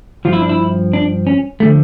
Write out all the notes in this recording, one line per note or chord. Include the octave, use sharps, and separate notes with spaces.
G2 F3 F4
E4
D4
E4
D4
C#4
D3 F3 A3